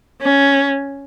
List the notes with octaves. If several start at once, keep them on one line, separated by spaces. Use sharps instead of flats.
C#4